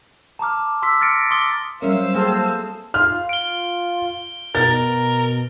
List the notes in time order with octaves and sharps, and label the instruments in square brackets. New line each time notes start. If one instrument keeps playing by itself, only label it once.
[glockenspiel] A5 A#5 D6 F6
C6 D6 E6 B6
F6 A6 A#6 C#7 D7
C6 D6 D#6 A6 G7
[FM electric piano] F#3 G3 A#4 [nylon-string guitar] C#4 E5 [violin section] C5 F5 E6
[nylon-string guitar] A#3 F#4 G5 [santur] C4 G#4 A4
[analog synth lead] F4 [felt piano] F6
[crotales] D7 G7
[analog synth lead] B2 [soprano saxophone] A#4 [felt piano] A6